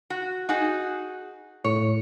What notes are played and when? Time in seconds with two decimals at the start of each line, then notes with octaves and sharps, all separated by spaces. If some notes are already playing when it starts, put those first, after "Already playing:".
0.10 F#4
0.49 D#4 F#4 G#4
1.64 A2 C#5